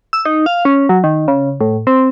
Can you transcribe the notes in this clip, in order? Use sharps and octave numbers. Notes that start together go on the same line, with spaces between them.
E6
D#4
F5
C#4
F#3
D#3
C#3
A2
C4